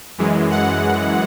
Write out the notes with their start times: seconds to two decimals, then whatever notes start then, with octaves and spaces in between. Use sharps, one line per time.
0.18 F#2 E3 G#3
0.51 F#5